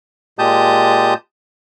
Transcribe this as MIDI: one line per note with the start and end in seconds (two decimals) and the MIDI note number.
0.39 1.14 46
0.39 1.14 56
0.39 1.14 67
0.39 1.14 81
0.39 1.14 87
0.39 1.14 91